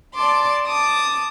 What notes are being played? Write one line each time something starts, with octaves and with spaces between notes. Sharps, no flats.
D5 A5 C6 D6
A5 D6 D#6